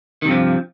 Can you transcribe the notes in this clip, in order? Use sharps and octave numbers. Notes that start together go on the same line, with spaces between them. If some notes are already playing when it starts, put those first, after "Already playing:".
G2 C3 D#3 F3